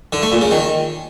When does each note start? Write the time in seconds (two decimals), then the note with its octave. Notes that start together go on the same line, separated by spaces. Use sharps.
0.13 D3
0.22 A3
0.32 A#2
0.42 C#3
0.51 D#3